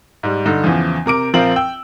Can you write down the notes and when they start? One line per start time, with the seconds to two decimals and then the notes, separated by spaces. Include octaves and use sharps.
0.23 G#2 G3
0.45 G2 D3 D#4
0.63 E2 C#3 E3 F3
1.06 C3 A#4 D6 D7
1.34 A#1 F3 C4 F4 A#4 F#7
1.56 G5 E6